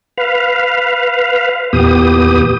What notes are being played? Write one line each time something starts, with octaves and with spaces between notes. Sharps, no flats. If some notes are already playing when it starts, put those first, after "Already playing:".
B4 F5
E2 A#2 B3 G4 D#6